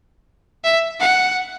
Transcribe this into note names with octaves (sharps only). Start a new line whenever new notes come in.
E5
F#5